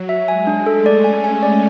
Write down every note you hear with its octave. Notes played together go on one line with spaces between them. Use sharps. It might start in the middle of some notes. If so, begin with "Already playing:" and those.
Already playing: F#3
E5
G#3 G#5
D4
A3 A4
D5
C#4 G#5
G#5
D5